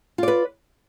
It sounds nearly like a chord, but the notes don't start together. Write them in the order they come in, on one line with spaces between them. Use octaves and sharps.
F4 D5 B4